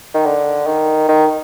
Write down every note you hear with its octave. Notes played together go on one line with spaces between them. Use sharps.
D#3
D3
D#3
D#3